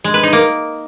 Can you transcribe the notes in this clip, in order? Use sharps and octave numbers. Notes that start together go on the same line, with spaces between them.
G#3
B4
D#4
A#3